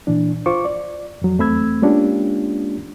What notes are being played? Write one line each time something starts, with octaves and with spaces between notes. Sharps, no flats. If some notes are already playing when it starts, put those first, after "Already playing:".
A#2 E3 D4
F4 C5 C#6 D6
D5
F2 F#3
E2 A3 C4 B5 E6 G#6
G#3 A#3 C#4 D4 F4 G4